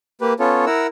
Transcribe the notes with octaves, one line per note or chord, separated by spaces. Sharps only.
A#3 G4 B4
B3 C#4 F4 A4 C#5
E4 A#4 F#5 E6